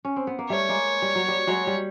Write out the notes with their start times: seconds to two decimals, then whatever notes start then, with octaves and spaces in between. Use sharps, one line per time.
0.05 C#4
0.16 C4
0.27 B3
0.39 A#3
0.50 G3 A3 C#5
0.69 G#3 A#3
1.02 G3
1.15 F#3
1.28 G3
1.47 F#3 G#3
1.67 G3